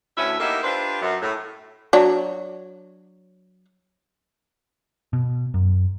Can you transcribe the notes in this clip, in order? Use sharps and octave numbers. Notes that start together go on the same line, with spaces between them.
D2 A2 C#4 E4 B4 E5
A#3 B3 D#4 E4 G4 A4
D4 F4 G4 B4 C5
F#2
A2
F#3 D4
B2
F#2